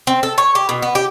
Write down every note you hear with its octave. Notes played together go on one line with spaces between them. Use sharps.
C4
A4
C#5
G4
B2
B3
G4